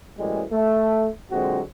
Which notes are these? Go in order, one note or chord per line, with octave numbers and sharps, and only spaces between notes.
F#2 A2 E3 G3 G#3
A3
A#2 D3 F#3 G#3 C4 F#4